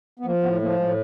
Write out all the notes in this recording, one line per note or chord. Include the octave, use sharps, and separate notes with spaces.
B3
F3 A#3
A2 B3
F3 A#3
A2 G#3